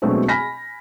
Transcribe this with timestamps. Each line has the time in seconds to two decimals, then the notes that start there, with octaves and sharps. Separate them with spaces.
0.02 B2 F#3 G#3 A3 C4 D4
0.28 G#5 B5 F6 A#6 B6